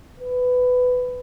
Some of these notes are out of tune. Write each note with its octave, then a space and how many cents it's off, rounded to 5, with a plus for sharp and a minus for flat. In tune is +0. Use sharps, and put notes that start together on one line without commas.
B4 +15